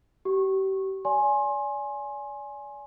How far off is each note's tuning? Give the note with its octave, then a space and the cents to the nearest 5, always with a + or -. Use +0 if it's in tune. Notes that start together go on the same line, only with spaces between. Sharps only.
G4 -35 C#6 -20
D5 -30 G#5 +10 C6 +30